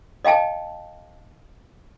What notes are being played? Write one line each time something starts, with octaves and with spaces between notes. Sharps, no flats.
D#5 F5 G5 A5